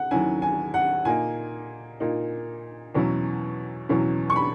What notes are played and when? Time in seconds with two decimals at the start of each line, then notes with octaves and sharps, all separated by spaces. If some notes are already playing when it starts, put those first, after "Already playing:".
Already playing: F#5
0.11 D#2 D#3 F#3 C#4 E4 G#5
0.42 G#5
0.74 F#5
1.05 A#2 A#3 D#4 G#5
2.00 A#2 A#3 D#4
2.95 E2 B2 F#3 C#4 E4
3.89 E2 B2 F#3 C#4 E4
4.30 C#6
4.36 B5